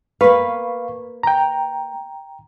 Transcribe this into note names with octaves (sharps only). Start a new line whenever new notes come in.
A#3 B4 F5 B5 C#6
G5 A#5